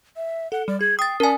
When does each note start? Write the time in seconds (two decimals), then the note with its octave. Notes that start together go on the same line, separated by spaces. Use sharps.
0.16 E5
0.52 A4 F#5
0.68 G3 D5
0.81 G#4 G#6
0.99 G5 D#6 A6 C7
1.20 C#4 A#4 D5 G#5 A5